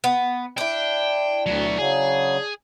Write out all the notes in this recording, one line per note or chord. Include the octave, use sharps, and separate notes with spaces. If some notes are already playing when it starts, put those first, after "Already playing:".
B3
D4 E4 G5
D2 F#3 B3
C#3 F#3 G#4